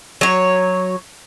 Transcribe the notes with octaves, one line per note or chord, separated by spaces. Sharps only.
F#3 C#5